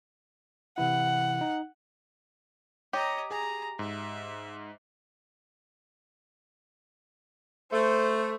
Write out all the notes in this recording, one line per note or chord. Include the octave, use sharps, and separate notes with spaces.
C3 E3 E4 F#5
D#4
G4 C#5 D#5 A#5
G#4 G#5 A#5
G#2 E5
A3 C5